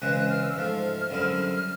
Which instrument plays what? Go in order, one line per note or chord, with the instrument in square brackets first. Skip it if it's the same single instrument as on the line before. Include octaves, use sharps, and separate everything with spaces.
[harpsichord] C#2 C#3 E3 G#3 C4 [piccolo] F#6
[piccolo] F#6
F6
E6
[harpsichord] G#2 F3 A3 [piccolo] F6
[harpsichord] F#2 D3 G3 C4 E4